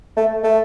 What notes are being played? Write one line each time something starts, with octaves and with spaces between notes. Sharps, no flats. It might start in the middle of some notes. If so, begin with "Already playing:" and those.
A3
A3